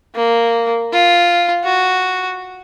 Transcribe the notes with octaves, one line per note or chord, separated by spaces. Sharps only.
A#3
F4
F#4